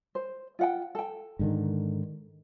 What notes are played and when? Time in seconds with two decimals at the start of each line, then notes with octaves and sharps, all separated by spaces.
0.15 C5
0.59 F4 F#5 G5
0.95 A4 G5
1.39 G#2 D3 D#3